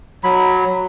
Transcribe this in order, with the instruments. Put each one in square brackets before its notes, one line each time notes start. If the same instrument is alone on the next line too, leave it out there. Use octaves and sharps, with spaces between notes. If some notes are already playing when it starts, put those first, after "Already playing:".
[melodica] F#3 B5